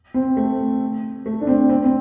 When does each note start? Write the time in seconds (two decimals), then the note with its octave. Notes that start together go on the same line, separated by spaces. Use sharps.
0.14 C4
0.37 A3
1.26 A3
1.41 D4
1.47 C4
1.69 C4
1.84 C4